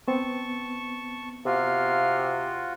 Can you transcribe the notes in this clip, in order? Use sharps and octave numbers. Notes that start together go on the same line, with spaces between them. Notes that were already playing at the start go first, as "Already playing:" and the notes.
B3 C4 A5 C#6
C3 F4 F#4 F5